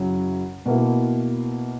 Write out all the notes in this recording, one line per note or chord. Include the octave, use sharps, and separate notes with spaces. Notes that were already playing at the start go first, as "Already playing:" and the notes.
Already playing: F#2 C#3 F#3 C#4 E4
B2 A#3 E4